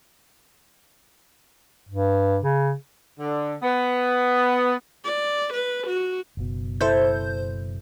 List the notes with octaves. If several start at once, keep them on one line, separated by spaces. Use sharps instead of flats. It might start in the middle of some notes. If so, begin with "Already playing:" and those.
G2
C#3
D3
B3
D5
B4
F#4
F#1 B2
E4 A4 C5 G6